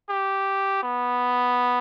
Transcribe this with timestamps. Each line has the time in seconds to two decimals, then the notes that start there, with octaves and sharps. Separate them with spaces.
0.09 G4
0.83 B3